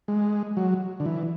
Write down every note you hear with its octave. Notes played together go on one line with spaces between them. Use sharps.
G#3
F#3
D3
E3